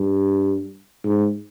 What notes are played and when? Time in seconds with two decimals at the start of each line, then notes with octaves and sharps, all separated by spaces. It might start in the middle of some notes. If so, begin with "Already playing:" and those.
Already playing: G2
1.05 G#2